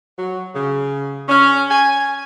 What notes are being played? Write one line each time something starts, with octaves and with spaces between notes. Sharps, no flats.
F#3
C#3
C#4
G#5